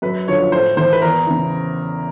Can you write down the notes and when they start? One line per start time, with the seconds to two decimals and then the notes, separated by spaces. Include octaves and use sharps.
0.02 F#2 B4
0.28 D3 F3 C#5
0.52 A2 C5
0.77 E3 C5
0.93 B4
1.02 E2 A#4
1.27 C#3 E3